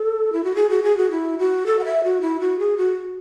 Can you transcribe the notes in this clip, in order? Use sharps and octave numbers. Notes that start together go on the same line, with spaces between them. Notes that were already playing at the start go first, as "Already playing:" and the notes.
Already playing: A4
E4
F#4
G#4
F#4
G#4
F#4
E4
F#4
A4
F#5
E5
F#4
E4
F#4
G#4
F#4